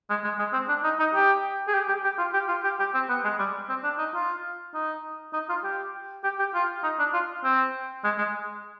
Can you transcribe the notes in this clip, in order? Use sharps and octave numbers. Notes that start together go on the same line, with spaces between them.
G#3
G#3
G#3
C4
D4
D#4
D#4
G4
G#4
G4
G4
G4
F4
G4
F4
G4
G4
C4
B3
G#3
G3
C4
D4
D#4
F4
D#4
D#4
F4
G4
G4
G4
F4
D#4
D4
F4
C4
G#3
G#3